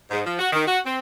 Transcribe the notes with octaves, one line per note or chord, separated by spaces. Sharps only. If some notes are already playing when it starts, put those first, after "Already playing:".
G#2
F3
F#4
D#3
F#4
C4